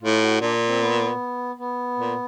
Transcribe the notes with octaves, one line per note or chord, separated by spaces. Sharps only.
A2 F4
F#4
A#2 D4
C4
B3
B3
A#2